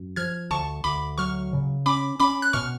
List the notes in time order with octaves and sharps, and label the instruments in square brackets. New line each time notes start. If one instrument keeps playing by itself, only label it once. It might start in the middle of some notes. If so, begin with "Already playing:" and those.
Already playing: [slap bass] F#2
[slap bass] F3 [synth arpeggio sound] F6 G#6
[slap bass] D2 [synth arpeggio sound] A5 C#6
[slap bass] D2 [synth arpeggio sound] B5 D6
[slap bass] F#3 [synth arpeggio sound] C#6 F6
[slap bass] C#3
[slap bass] C#4 [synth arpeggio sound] B5 D6
[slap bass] C#4 [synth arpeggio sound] B5 D6
[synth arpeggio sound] F#6
[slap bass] B2 [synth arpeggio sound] C#6 F6